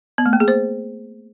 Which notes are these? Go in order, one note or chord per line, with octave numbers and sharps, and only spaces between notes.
B3
A3
A#3
G#4
C5